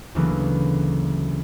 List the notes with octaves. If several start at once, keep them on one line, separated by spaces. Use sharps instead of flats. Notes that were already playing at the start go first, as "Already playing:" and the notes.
D2 C#3 E3 F#3 A#3 B3